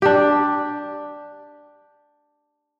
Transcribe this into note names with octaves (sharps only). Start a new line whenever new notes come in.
D4 G4